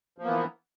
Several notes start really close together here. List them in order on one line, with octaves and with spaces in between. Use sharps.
F3 A#3 B3 E3